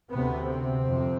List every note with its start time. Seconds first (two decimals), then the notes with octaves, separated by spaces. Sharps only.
0.11 D2 C3 B3
0.49 C4
0.85 F2 C3